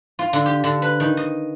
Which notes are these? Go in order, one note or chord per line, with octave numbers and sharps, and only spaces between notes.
F4
D3
G4
D3
B4
D#3
D#5